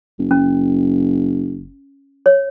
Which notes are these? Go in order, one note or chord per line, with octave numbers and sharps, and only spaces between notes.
F#1
C#4
C#5